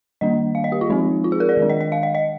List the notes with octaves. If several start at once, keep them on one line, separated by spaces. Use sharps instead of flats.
D#3 G3 A#3 D4 D#5
F5
D#5
G4
F4
F3 G#3 C4 D#4
F4
G#4
A#4
D5
D#3 G#3 D4
D#5
D#5
F5
D#5
D#5